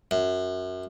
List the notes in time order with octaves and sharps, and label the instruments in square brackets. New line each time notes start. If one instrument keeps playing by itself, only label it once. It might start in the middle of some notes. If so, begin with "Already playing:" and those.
[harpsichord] F#2